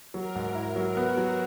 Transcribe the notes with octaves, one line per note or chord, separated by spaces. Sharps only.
F#3 A#4
G#2
E4
F#3
B3 F#4
F#3